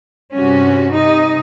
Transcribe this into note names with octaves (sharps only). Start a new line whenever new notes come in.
G2 C3 C#4 F#4
C3 D#4 D#5